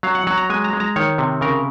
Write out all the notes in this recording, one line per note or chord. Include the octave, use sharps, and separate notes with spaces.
F#3 F5
F#5
F#3 F#5
A#5
G#3 G#5
A#5
G#3
A#5
D#3 C#5
C3
C#3 A#4